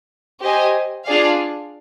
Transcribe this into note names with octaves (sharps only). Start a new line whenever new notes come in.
G4 C5 D#5 G#5
D4 F4 G#4 D5 F5